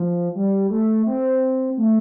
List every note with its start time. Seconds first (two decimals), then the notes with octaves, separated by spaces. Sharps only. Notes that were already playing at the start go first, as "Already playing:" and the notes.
Already playing: F3
0.35 G3
0.70 A3
1.06 C4
1.77 A3